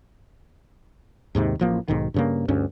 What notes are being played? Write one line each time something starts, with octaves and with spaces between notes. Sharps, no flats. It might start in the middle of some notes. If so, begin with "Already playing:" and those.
D#2 G#2 C3 D#3
A1 F3 A#3
B1 G#2 D#3
G2 C#3 A#3
D2 G2 C#4